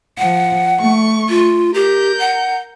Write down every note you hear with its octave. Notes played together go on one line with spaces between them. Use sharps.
F3 F#5
A3 C#6
F4
G4 A#4 G6
F#5